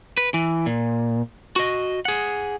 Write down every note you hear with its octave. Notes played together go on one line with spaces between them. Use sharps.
B4
E3
A#2
F#4 D#5
G#4 F#5